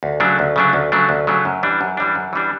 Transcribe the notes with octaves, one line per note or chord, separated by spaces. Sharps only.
D2
C#3 F#3 A3 D4
D2
C#3 F#3 A3 D4
D2
C#3 F#3 A3 D4
D2
C#3 F#3 A3 D4
F#2
E3 G3 D4
F#2
E3 G3 D4
F#2
E3 G3 D4